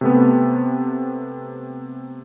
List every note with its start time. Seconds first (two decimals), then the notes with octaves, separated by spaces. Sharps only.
0.01 C3 A3 B3